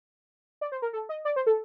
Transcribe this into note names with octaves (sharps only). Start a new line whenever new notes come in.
D5
C5
A#4
A4
D#5
D5
C5
A4